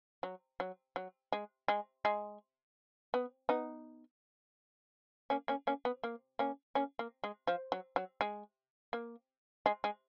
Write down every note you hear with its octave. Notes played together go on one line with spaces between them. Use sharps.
F#3
F#3
F#3
G#3
G#3
G#3
B3
B3 D#4
A#3 C#4
A#3 C#4
A#3 C#4
B3
A#3
A#3 C#4
A#3 C#4
A#3
G#3
F3
F#3
F#3
G#3
A#3
G#3
G#3